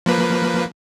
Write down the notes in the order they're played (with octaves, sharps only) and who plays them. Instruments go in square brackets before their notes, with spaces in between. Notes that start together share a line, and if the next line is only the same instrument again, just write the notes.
[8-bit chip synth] F3 A#3 B4